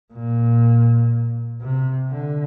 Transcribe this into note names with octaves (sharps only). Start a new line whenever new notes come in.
A#2
C3
D3